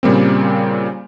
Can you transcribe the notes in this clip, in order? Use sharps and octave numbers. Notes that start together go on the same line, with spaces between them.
A#2 C#3 G3 A#3 C4